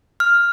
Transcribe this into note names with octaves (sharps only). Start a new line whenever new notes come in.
F6